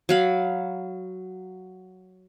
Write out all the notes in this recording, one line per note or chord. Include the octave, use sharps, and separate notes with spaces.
F#3 F5 B5